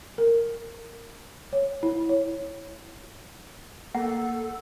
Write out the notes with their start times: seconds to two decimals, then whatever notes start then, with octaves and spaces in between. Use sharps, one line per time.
0.18 A#4
1.53 C#5
1.83 E4
2.09 C#5
3.95 A#3 A4 F#5